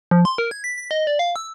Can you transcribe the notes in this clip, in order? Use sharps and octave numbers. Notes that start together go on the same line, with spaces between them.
F3
C6
A#4
G#6
B6
B6
D#5
D5
F5
E6